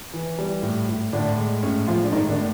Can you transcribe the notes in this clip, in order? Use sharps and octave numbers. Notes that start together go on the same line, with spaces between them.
E3
G3
A2
A2
A2 D3 D4
G#3
A2 C#4
F3 G#3 F4
D4
A2 D#3 D#4
D3 D4
A2